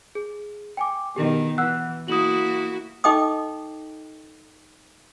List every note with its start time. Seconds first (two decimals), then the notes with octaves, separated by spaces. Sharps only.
0.15 G#4
0.77 G5 G#5 D6
1.16 B2 D#3 G4
1.58 E3 F#5 E6 F#6
2.08 A#3 E4 F#4 D#6 F#7
3.04 D#4 A4 D#5 G5 D6 D#6